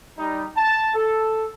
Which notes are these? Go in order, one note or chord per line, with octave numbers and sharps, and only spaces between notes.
G3 D#4
A5
A4